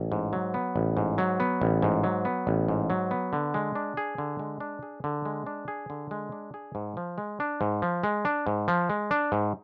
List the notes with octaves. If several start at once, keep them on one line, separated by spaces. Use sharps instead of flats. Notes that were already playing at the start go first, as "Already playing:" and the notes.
Already playing: A1
G#2
F#3
B3
A1
G#2
F#3
B3
A1
G#2
F#3
B3
A1
G#2
F#3
B3
D3
G#3
D4
G#4
D3
G#3
D4
G#4
D3
G#3
D4
G#4
D3
G#3
D4
G#4
G#2
F3
G#3
D4
G#2
F3
G#3
D4
G#2
F3
G#3
D4
G#2